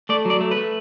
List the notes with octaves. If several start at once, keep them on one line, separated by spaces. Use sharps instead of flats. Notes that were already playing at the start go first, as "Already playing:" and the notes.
A3 D5
F#3 D5
A3
B4
A3